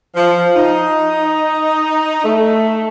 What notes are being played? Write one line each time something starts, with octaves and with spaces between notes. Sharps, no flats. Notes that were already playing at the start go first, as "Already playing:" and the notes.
F3
D#4
A3